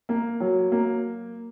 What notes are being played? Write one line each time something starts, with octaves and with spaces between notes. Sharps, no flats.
A#3
F#3
A#3